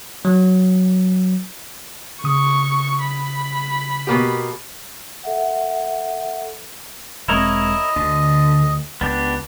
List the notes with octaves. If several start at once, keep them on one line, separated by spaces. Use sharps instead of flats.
F#3
C#3 C#6 D#6
B5
B2 A#3 G4
A4 E5 F#5
E1 G#3 C4 E4 A#4 C#5 D#5
D2 D3
C#2 B3 D4 G4